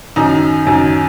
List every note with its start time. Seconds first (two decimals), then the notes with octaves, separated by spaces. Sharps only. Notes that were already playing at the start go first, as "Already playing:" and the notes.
0.16 F#2 D#3 D#4
0.67 F#2 D#3